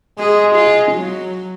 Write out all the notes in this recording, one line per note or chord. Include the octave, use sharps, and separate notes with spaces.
G#3 G#4
F4
F#3